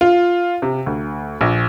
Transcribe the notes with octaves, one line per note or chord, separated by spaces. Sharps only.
F4
C3
D2
A#1